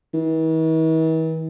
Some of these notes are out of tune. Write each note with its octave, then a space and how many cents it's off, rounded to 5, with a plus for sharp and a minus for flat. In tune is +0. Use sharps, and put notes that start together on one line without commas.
E3 -45